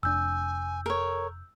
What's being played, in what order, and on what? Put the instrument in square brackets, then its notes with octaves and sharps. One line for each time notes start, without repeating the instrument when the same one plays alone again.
[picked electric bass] F1 D4 [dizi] G#5 [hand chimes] E6 G6
[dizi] A4 [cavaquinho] A#4 C#5